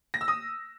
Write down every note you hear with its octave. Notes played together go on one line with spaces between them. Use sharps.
A#6
E6
D#6